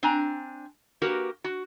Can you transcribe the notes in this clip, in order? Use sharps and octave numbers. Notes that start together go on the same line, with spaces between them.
C4 D4 G#5 A#5
A#3 F#4 G4 A#4 B4
F#4